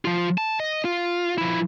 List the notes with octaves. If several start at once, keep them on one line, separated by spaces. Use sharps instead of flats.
F3 F4
A5
D#5
F4
F3 E4